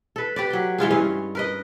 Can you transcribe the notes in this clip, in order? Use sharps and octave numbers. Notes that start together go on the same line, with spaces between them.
A4 B4
G4 B4 D5
F#3 G5
E3 G#3 F4 G#4
G2 C#4 D#5 F5
A#4 B4 D#5